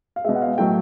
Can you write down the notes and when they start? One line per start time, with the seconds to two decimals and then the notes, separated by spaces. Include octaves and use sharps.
0.16 F5
0.25 B2 G#3 E5
0.35 F#5
0.42 F5
0.58 A2 F#3 A3 G5